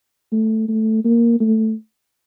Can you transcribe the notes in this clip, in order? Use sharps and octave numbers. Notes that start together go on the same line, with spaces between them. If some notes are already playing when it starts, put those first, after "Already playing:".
A3
A3
A#3
A3